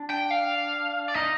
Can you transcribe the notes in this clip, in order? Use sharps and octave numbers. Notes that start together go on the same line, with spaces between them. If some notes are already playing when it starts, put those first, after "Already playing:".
Already playing: D4
G5
F5
D5
D#4 D#5